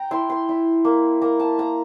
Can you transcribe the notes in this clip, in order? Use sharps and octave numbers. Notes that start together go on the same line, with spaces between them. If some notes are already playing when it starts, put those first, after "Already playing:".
Already playing: G5 A#5
E4 C6
C6
E4
A#3
A#3 A#5
A5
A#3 A#5